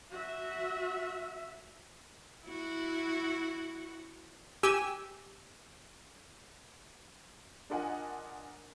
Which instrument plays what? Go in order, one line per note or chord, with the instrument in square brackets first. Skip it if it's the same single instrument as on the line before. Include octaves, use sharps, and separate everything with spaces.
[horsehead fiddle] F#4 E5
[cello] E4 F#4
[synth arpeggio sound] G4 G#5 E6
[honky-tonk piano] D4 F4 A#4 D#5 F#5 G#5